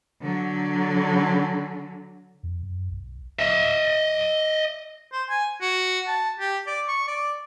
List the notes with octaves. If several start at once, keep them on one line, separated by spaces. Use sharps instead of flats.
D3 F#3
F2
F#2
B1
D#5 E5
C5
G#5
F#4
A5
G4
D5
C#6
D5